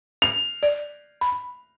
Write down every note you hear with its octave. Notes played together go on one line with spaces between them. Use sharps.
F7
D5
B5